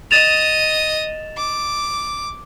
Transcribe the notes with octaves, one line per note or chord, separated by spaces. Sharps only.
D#5 D#6 A6 E7 F7
D6